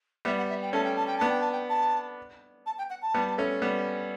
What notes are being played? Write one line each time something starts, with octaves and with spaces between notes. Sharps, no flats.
G3 B3 E5
F#5
E5
G5
A3 C#4 A5
G5
A5
G5
B3 D4 A5
G5
A5
G5
A5
A5
G5
F#5
A5
G3 B3
A3 C#4
G3 B3